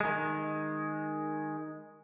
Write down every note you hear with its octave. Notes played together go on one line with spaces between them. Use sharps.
D#3 G#3